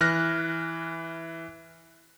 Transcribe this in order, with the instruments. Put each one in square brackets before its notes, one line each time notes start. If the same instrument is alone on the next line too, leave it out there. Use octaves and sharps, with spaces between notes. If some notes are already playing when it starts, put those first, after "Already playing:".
[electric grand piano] E3 F6 F#6 A#6